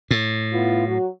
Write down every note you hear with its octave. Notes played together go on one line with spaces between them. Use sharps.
A2
B3 E4 F4
F#3 F#4